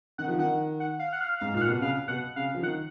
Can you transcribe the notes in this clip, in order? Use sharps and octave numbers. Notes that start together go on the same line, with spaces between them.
D#3 F#5
F3
D#3 F#5
F#5
F5
F#5
F5
G#2 F5
A#2 F5
F#5
B2
C#3 F5
B2 F#5
C#3 F5
F3
D#3 F#5